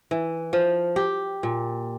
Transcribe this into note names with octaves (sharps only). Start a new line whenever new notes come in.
E3
F3
G4
A#2